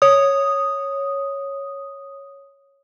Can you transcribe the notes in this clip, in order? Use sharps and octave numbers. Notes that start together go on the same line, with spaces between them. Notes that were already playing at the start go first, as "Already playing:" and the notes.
C#5 D#6